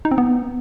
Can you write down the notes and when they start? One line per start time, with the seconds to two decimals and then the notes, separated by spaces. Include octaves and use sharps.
0.05 D#4
0.11 C4
0.18 B3